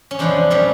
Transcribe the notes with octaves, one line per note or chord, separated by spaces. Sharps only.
C#4
E2 C3 F3 G#3 D4
A#2 G3 C#4